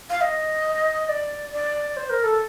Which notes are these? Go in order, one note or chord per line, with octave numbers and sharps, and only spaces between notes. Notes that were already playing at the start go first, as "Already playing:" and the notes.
F5
D#5
D5
D5
C5
A#4
A4